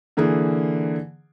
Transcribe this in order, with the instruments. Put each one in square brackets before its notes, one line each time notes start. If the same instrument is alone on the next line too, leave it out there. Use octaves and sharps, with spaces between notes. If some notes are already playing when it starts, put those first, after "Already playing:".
[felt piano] D3 E3 A#3 G#4